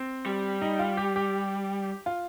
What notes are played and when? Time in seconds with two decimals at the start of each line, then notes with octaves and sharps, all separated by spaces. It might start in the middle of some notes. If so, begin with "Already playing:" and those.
Already playing: C4
0.26 G3
0.61 D#4
0.79 F4
0.97 G4
1.16 G4
2.06 F4